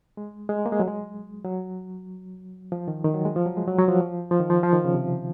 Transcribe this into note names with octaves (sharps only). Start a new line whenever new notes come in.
G#3
G#3
A#3
G#3
F#3
G#3
F#3
F3
D#3
D#3
F#3
G#3
F3
F#3
G#3
F#3
F#3
F3
F3
D#3
F3
F3
D#3
C#3
C3